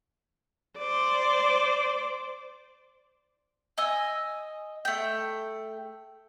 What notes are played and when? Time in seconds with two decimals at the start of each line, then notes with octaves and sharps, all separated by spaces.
0.78 C5 D5
3.78 D#5 G#5 E6
4.85 A3 G5